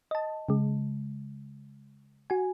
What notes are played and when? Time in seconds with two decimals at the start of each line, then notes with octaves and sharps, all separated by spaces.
0.11 D#5 A5
0.49 C#3 G#3
2.30 F#4 G#5